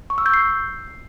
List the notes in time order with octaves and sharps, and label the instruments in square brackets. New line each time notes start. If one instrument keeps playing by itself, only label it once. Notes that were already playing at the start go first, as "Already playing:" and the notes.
[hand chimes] C#6
E6
G6
C7